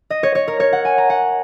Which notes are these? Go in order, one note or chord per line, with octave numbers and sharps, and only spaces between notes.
D#5
C#5
C#5
A#4
C#5
F#5
G#5
A#5
F#5